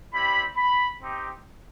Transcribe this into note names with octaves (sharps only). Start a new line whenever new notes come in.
G3 C4 E4 G4 B5
B5
C4 D#4 G4